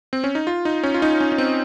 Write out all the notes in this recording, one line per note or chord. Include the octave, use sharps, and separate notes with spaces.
C4
C#4
D#4
F4
D#4
C#4
F4
D#4
C#4
C#4
C4